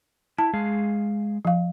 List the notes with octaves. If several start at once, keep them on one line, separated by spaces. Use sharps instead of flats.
E4 A5
G#3 G#4 F5
F3 F5